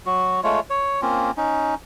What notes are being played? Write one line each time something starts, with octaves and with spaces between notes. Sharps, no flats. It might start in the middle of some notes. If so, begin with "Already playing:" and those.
F#3 F#4
G#3 A3 F4 C#5
C#5
A#3 C4 C#4 F4
C#4 D#4